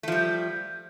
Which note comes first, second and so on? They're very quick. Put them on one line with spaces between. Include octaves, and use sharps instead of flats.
A3 F3 G3